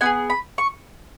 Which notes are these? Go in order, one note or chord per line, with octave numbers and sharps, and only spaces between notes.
B3 E4 G#4 G#5
B5
C#6